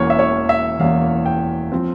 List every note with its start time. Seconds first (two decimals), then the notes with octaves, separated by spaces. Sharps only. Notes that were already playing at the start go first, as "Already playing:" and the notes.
Already playing: E1 E2 E3 A#3 C#4 C#5
0.10 E5
0.19 C#5
0.49 E5
0.80 E1 E2 E3 A#3 C#4 F5
1.26 G5
1.72 F3 C4